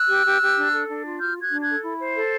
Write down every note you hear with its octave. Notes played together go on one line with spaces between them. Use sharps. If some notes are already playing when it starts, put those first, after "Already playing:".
Already playing: E6 F#6
G4
G4
G4
D4
A4
D4
F4
F#4 F6 G6
F#4 F#6 G#6
D4
F#6 G#6
A4
E4
C5
A4